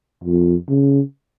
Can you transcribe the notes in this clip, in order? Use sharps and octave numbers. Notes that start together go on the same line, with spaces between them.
F2
C#3